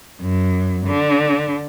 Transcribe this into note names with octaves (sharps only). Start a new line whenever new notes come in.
F#2
D3